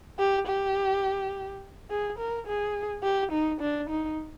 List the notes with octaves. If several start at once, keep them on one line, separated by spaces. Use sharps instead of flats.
G4
G4
G#4
A#4
G#4
G4
D#4
D4
D#4